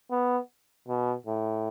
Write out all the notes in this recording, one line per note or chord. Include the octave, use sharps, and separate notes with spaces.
B3
B2
A2